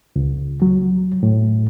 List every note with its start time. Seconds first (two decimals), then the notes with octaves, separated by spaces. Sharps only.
0.16 C#2
0.62 F#3
1.23 A2